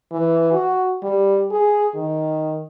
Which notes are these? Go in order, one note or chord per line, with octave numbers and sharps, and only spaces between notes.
E3
F#4
G3
G#4
D#3